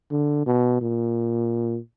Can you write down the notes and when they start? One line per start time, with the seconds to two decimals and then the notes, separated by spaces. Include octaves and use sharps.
0.11 D3
0.47 B2
0.81 A#2